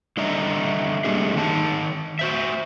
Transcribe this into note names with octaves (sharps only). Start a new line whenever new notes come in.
D3 G3 D4 D#5 E5 A#5
G3 A3 A#3 D4 G4 G#4
D#3 C4 D#4 A5
F#4 C5 E5